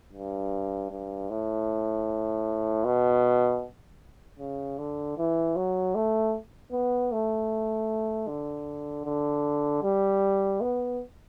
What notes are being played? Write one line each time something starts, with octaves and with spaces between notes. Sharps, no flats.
G2
G2
A2
B2
C#3
D3
E3
F#3
A3
B3
A3
D3
D3
G3
B3